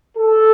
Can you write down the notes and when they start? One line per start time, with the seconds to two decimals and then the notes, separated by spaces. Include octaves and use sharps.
0.17 A4